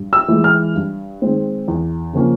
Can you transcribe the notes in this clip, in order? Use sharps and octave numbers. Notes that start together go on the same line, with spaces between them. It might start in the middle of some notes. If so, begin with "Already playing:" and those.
Already playing: G2
E6
E3 G#3
F6
G2
D#3 G#3 C4
E2
C#3 F3 A#3 C#4